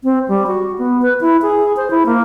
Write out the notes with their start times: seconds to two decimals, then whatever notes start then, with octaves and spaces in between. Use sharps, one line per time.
0.04 C4
0.28 G3
0.47 F#4
0.78 B3
1.02 B4
1.21 E4
1.42 G#4
1.77 C5
1.91 E4
2.06 A#3